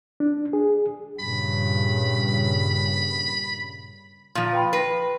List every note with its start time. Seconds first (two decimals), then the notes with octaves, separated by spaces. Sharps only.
0.20 D4
0.53 G#4
1.20 G2 A#2 C#3 B5
4.35 A#2 F3
4.53 B4 G5 B5
4.73 B4 A#6 C7